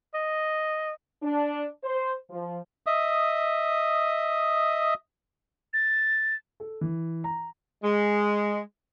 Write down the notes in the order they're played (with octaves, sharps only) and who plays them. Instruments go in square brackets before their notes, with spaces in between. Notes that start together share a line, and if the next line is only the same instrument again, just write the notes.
[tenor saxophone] D#5
[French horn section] D4
C5
F3
[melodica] D#5 E5 D#6
[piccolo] A6
[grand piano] A4
E3
A#5
[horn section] G#3